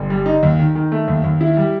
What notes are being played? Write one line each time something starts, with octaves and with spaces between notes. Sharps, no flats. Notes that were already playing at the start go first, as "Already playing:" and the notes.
Already playing: G1
G3
D#4
D#2
D#3
D#3
A3
D#2
D#2
E4
G3